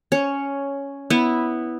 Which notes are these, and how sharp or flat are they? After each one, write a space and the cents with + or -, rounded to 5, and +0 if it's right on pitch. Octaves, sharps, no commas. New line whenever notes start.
C#4 +5 C#5 +0
B3 +0 E4 -10